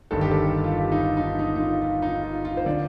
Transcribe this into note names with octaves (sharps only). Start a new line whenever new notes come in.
G1 G2 D#3 A4
G4
A4
F4
G4
D#4
F4
D#4
D#4
D#4
F4
F4
D#4
F4
F4
C5
D3 D5